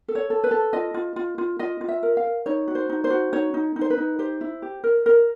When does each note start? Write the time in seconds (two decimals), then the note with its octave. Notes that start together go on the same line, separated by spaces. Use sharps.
0.08 A4
0.15 C#5
0.30 A4
0.44 B4
0.51 A4
0.73 F4 D#5
0.94 F4
1.16 F4
1.38 F4
1.59 F4 D#5
1.81 F4
1.88 E5
2.03 A#4
2.17 F5
2.24 A#4
2.46 D#4 C#5
2.68 F#4
2.75 C5
2.89 D#4
3.04 C5
3.10 F#4
3.33 D#4 C#5
3.54 D#4
3.76 D#4
3.81 C5
3.90 B4
3.97 D#4
4.19 G4 C5
4.41 E4
4.62 G4
4.84 A#4
5.06 A#4